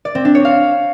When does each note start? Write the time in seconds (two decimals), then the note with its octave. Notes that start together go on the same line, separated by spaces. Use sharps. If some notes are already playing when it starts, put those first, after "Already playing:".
0.05 D5
0.15 C4
0.25 D4
0.35 C#5
0.45 F5